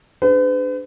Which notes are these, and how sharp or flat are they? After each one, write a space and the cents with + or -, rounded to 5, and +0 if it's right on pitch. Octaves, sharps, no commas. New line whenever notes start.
D4 +0 G#4 +0 B4 +45